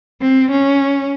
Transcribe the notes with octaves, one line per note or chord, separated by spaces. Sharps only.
C4
C#4